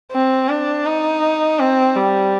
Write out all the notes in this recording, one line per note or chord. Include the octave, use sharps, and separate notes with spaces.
C4
D4
D#4
C4
G3